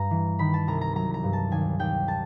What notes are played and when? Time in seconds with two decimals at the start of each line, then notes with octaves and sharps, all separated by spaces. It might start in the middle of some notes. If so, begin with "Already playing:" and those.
Already playing: G2 A#5
0.11 E3
0.39 D#3 B5
0.53 A5
0.67 C2 A#5
0.81 A#5
0.95 F#3 A#5
1.14 A#5
1.24 G2
1.33 A5
1.51 D#2 G#5
1.79 D#2 G5
2.08 A5